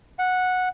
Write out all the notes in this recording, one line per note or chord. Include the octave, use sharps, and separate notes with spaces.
F#5